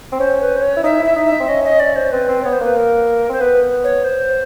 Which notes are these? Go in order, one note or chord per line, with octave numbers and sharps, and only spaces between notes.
C4
C#4 C5
B4
C5
C#5
E4
D#4 E5
E4
E5
D#4
E5
D#4
C4
C#4 D#5
D#5
D5
C5
C4 B4
C4
B3 C#5
C5
A#3 B4
A#4
C4 C5
B3 B4
C#5
C5